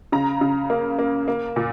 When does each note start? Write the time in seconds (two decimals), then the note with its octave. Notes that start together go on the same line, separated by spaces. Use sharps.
0.12 C#3 A#5
0.41 C#3
0.70 A#3
0.99 A#3
1.28 A#3
1.56 A#2